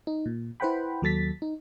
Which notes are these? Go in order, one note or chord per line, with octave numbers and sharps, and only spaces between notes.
D#4
A#2
E4 B4 C5 F#5 G5 B5
D#2 F#3 A4 A6 B6
D#4